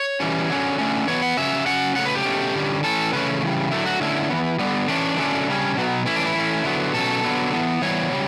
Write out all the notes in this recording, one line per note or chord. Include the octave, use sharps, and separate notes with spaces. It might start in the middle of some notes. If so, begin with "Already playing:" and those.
Already playing: C#5
E3 G3 C#4
D3 F#3 C#4
D3 A3 C#4
E3 B3 C#5
F#5
C#3 F#3 C#4 E5
C#3 F#3 C#4 F#5
C#3 F#3 A3 F#5
B4
G4
B2 A3 C#4
D3 G3 C#4
E3 A3 C#4 A4
C#3 E3 A3 C#4 B4
C#3 E3 G3
D3 F#3 A3 E4
F#4
D3 A3 C#4 E4
E3 B3
D3 G3 B3
E3 A3 C#4 D4
D3 F#3 A3 C#4
C#3 G3 C#4
B2 F#3 B3
E3 A3 C#4 E4
D4
E4
E3 A3 C#4
D3 F#3 B3
B2 F#3 C#4 A4
D3 F#3 B3
E3 B3
E3 G3 B3 C#5
C#3 G3